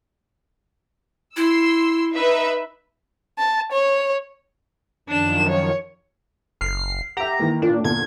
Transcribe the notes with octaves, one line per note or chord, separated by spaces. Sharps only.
E4 C6 E6
D#4 B4 E5
A5
C#5
F#2 D#3 F3 D4 E7
C#5
F#1 F6 C7
G4 E5 F#5 A#5
D#3 E3 A#3
A#2 D4
E2 A#2 D3 G#6